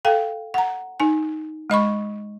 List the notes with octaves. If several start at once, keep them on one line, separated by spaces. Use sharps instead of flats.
A4 F5 G5
F#5 A#5
D#4 G#5
G#3 D#5 B5 C#6